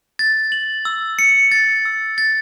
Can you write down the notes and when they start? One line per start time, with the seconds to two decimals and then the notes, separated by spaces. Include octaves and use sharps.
0.19 A6
0.52 F#7
0.85 E6
1.19 C#7
1.52 A6
1.85 E6
2.18 A6